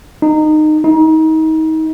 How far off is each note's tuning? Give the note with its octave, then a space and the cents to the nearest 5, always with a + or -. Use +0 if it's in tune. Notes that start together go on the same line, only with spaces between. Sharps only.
D#4 -20
D#4 +30